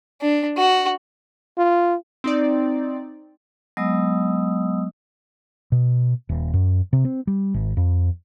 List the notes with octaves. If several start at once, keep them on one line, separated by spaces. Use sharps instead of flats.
D4
F#4
F4
C4 D#4 D5
F#3 G#3 B3 D#5 D#6 E6
B2
D#1
F#2
C3
C4
G3
G#1
F2